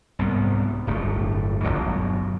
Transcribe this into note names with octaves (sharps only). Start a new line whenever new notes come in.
C2 G#2 B3
D1 G1 G2 A3
G1 D#2 B2 F#3